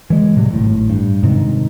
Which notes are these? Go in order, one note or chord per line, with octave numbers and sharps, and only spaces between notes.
E3 G#3
A2 C3 F#3 G3
G#1 A2
G2
G#2 C3 D#3